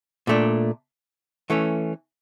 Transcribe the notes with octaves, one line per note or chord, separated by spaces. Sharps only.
A#2 A3 D4
E3 A3 C#4